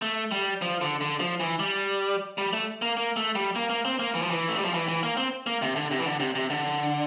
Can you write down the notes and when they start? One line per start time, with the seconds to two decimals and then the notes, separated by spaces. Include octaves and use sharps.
0.02 A3
0.32 G3
0.62 F3
0.81 D3
1.01 D3
1.20 F3
1.40 E3
1.60 G3
2.38 G3
2.53 A3
2.82 A#3
2.97 A#3
3.17 A3
3.35 G3
3.56 A#3
3.70 A#3
3.85 C4
3.99 A#3
4.14 E3
4.22 F3
4.30 E3
4.48 A3
4.57 G3
4.65 F3
4.74 E3
4.88 E3
5.03 A#3
5.17 C4
5.47 A#3
5.62 C3
5.76 D3
5.91 C3
5.99 E3
6.06 D3
6.20 C3
6.35 C3
6.50 D3